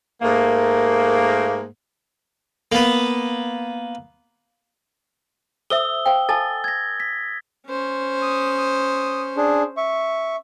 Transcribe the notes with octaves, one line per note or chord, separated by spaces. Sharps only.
G#2 A3 A#3
A#3 B3
A4 C5 E5 D#6 E6 G7
C5 F5 G5
A4 G#5 A5 A6
G#6 A#6
B6
C#4 C5
D#6
D#6
D4 G#4
E5 C#6